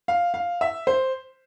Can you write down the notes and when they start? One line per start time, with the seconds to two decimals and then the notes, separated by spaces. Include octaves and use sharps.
0.08 F5
0.34 F5
0.61 E5
0.87 C5